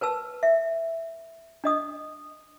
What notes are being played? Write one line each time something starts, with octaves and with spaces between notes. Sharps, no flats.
A#4 B4 A5 E6
E5
D4 D#5 D#6